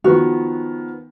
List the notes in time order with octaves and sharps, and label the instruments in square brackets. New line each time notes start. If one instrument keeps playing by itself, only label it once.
[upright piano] D#3 F3 B3 [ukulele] F#4